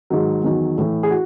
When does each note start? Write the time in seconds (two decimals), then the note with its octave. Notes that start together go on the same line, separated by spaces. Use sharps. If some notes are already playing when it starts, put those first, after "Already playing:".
0.10 G#2 D#3 F#3
0.43 E2 D#3 F#3
0.78 A2 E3
1.03 G#4
1.10 F#4